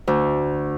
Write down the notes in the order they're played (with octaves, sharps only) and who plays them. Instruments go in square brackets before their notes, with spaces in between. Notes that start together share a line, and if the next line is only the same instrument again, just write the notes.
[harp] D2